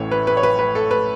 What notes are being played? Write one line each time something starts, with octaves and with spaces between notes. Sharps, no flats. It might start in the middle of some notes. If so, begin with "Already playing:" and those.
Already playing: A1 A2 E3 C#5
B4
B4
C#5
B4
B4
A4
B4